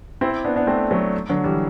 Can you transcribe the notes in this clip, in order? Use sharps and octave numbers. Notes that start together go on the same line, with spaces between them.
C4 E4
B3 D4
B3 D4
A3 C4
F#3 A3
D3 F#3
E3 G3